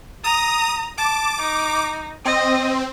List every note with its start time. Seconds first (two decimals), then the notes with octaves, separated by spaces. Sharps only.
0.24 A#5 D#6
0.98 A5 D6
1.41 D#4
2.25 C4 D#5